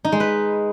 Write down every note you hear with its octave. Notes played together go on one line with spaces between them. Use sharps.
D#4
G#3
B4